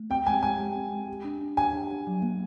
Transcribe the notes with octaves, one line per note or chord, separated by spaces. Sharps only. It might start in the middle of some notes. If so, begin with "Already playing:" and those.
Already playing: A3
C4 G5
G#3 G#5
G#3 G#5
G#3
C4
G#3
G4
D4
D4
D4 G#5
D4
D4
F#3
A#3